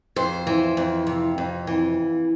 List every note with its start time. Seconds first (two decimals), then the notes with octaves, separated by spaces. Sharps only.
0.16 F2 C5
0.47 E3
0.77 F2
1.07 C3
1.38 F2
1.67 E3